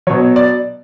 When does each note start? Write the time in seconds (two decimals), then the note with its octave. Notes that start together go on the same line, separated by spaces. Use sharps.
0.07 B2 F#3 C#5
0.36 D5